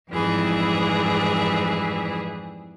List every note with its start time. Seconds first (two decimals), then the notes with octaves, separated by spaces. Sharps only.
0.11 F2 G#2 E3 G3 G#4